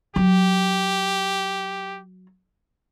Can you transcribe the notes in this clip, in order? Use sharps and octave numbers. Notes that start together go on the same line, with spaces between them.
F#3 G4